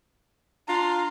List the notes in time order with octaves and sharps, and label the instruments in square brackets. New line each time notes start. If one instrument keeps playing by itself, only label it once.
[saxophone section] D4 F4 [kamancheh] A#5 C6